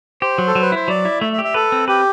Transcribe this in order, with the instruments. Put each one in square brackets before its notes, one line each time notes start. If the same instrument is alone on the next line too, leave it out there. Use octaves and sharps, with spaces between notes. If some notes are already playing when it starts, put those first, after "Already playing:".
[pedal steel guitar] G4 [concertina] C5
[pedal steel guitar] F#3
[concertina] A4
[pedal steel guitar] F#3
[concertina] B4
[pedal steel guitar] E4 [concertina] C5
[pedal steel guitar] F#3 [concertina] D5
[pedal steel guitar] E4
[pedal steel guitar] A3 [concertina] E5
[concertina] E5
[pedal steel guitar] G4
[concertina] E5
[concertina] A4 [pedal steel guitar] B4
[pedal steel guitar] C4
[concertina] G4 [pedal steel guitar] B4